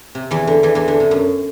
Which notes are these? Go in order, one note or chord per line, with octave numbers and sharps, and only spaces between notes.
C3
E2 E3
D3
E2 E3
E2 E3
D3
C3
F#2